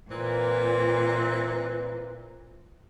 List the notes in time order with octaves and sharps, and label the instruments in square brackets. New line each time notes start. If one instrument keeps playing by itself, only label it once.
[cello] A#2 [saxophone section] E3 C4 B4